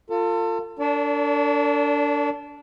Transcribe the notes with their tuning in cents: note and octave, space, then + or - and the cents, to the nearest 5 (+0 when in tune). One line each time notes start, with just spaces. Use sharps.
F4 +0 A4 +35
D4 -15 A#4 -45 D5 -45